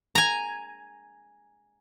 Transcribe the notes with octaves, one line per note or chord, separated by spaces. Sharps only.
G#5 A#5